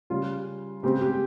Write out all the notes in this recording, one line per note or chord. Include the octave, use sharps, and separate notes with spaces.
C#3 G3 C#4 F4
C#3 G#3 C4 G4
G4